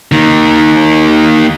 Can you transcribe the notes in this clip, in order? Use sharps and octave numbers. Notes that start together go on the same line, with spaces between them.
D#3 A#3